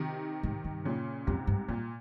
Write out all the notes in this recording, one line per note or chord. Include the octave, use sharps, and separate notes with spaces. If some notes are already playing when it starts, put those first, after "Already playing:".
Already playing: C3 D#3
G#2
G2
A#2 C#3
F2 G#2 C3
G2
G2 A#2